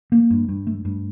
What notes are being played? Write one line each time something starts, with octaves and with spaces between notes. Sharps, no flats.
A#3
G2
G2
A3
G2